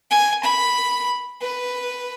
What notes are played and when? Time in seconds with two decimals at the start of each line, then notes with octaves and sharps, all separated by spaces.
0.11 G#5
0.43 B5
1.41 B4